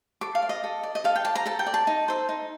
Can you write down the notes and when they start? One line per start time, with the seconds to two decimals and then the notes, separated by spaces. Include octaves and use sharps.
0.21 A4 D6
0.35 F5
0.42 D5
0.49 D#5
0.64 A4
0.83 D5
0.95 D#5
1.04 A4 F5
1.15 G5
1.25 D5 A5
1.35 A#5
1.46 A4 A5
1.59 G5
1.66 D5
1.74 A5
1.87 D#4
2.08 A4 C5
2.29 D#4